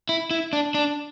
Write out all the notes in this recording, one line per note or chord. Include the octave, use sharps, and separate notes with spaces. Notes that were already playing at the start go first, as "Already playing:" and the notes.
E4
E4
D4
D4